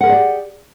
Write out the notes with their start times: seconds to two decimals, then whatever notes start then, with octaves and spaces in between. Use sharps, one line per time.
0.01 F#5
0.03 A#4
0.06 G#4
0.09 D5
0.12 G4